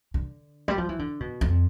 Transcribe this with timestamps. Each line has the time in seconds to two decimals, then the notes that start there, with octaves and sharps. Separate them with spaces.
0.14 D3
0.68 G3
0.78 F3
0.89 E3
0.99 D3
1.20 B2
1.41 F2